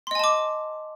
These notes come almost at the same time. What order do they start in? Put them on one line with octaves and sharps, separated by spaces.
C6 D#5 G#5 A5 D6